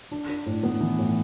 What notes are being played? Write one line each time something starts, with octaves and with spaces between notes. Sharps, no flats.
D4
D4
A2
B3
E3
A2